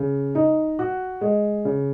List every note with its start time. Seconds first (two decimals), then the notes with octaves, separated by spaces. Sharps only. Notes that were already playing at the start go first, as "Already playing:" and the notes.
Already playing: C#3
0.35 D#4
0.79 F#4
1.21 G#3
1.65 C#3